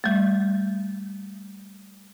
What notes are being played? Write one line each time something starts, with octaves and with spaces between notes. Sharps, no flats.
G3 A3